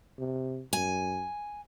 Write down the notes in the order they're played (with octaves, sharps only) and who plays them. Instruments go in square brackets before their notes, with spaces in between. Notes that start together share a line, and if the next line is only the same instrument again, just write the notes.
[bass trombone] C3
[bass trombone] F#2 [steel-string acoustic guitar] G#5